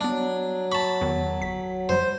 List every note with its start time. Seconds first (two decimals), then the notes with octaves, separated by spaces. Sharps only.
0.01 F#3 G3 B3 D4
0.72 A5 B5 C#6
1.01 E2 D#3
1.41 G1 B6
1.89 F#2 F3 G3 C5